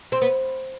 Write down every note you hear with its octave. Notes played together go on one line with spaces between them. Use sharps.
C4
B3